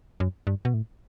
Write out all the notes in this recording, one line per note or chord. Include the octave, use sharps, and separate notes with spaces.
F#2
G2
B2
A2